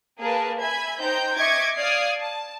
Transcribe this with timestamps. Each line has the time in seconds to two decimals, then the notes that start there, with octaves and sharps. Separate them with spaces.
0.17 A#3 G#4 A#4 B4 A5
0.60 E5 G#5 B5 G#6
1.00 D#4 C5 G5 A#5 G6
1.37 D#5 E5 C#6 D6 G#6 C#7
1.76 D5 F5 D#6 F6 G#6 C7
2.20 A5